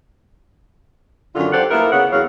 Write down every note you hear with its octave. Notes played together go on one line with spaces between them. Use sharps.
F#2 D3 D#3 F4
G4 A4 C5 D5 F#5
A#3 B3 E4 A4 A#4
C#3 B3 C#5 F#5
E2 F#3 C#4 F5